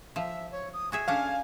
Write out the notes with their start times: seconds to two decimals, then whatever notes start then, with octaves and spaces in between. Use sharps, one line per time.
0.16 F3 E5
0.52 C#5
0.73 D#6
0.92 F#4 G#4 E5 G#5
1.08 C#4 D4 A4 F5